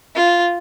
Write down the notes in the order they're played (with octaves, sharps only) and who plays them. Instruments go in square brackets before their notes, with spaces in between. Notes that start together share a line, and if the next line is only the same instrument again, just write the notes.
[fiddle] F4